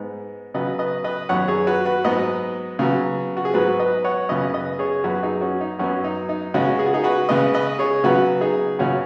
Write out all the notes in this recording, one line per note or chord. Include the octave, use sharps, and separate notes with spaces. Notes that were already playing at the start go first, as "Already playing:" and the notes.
Already playing: G#2 G#3 B3
C#3 F#3 B3 B4 D#5
B4 D#5
B4 D#5
F#2 D#3 F#3 B3 C#5 F#5
G#4 C#5
F#4 B4
F#4 B4
G#2 F#3 B3 B4 D#5
C#3 F#3 B3
F#4
G#4
G#2 F#3 B3 F#4 B4
B4 D#5
C#5 F#5
F#2 C#3 B3 B4 D#5
B4 D#5
G#4 C#5
F#2 F#3 B3 F#4 B4
D#4 G#4
C#4 F#4
D#4
F#2 F#3 B3 C#4 F#4
D#4
D#4
C#3 G#3 B3 C#4 F#4
G#4
F#4
D#4 G#4
F#4 B4
C#3 G#3 B3 B4 D#5
B4 D#5
G#4 C#5
C#3 F#3 B3 F#4 B4
D#4 G#4
F#2 C#3 B3 C#4 F#4